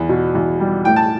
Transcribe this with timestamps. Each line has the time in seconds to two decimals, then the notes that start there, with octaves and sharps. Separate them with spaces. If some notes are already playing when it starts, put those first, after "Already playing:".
Already playing: E2
0.09 B2
0.35 E2
0.60 G3
0.85 A2 G5
0.96 A5